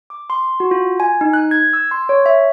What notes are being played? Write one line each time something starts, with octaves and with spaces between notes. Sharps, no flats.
D6
C6
F#4
F4
G#5
D#4
F#6
G#6
E6
C6
C#5
E5